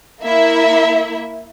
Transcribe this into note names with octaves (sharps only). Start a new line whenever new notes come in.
A#3 E4 E5